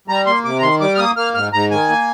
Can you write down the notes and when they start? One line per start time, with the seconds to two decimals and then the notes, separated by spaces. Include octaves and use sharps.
0.08 G3 A#5
0.26 A#3 C6
0.44 C3 D6
0.58 A#5
0.62 D#3 C6
0.81 G3 D6
0.95 F6
0.98 A#3 D#6
1.16 A#3 F6
1.34 G#2 F6
1.53 G#2 A#5
1.71 D#3 G#5
1.89 A#3